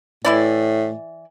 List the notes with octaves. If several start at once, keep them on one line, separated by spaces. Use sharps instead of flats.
A2 E3 E4 D5